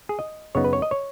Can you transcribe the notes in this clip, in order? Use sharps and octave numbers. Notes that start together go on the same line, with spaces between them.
G#4
D#5
F#2 C#3 B3 D#4 C#5
B4
C#5
D#5
C#5